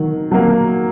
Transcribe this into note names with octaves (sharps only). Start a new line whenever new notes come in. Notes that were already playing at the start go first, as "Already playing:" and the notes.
Already playing: D#3 F#3
F#3 A#3